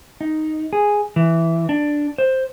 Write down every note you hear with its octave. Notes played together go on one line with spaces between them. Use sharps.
D#4
G#4
E3
D4
C5